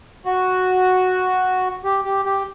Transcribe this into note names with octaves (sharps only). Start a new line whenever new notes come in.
F#4
G4
G4
G4